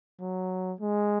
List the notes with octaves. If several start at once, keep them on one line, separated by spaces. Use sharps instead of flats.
F#3
G#3